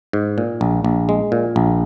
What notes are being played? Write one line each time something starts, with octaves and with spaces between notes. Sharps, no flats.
G#2
A#2
A#1
A#1
G#3
A#2
A#1